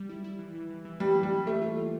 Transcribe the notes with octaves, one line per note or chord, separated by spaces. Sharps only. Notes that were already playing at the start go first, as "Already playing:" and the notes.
Already playing: G3
E4
E4
E3
E3
E3
E3
E3 G3
A#3
G3
E3
E3 A3
F4
F4